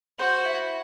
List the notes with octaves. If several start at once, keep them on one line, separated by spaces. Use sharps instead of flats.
F#4 C5
E4